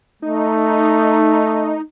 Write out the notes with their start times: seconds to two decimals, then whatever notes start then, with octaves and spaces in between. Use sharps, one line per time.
0.22 A3 D#4